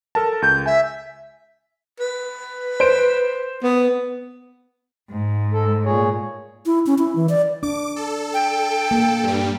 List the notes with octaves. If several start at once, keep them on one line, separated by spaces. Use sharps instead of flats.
A4 A#4 A5
C#2 G6
E5 G#5
B4
C5 D7
B3
G#2
A4
A#2 G#4 C#5
E4
C#4
E4
E3
D5
D4 D6
A4
G5
A#3
G2 G3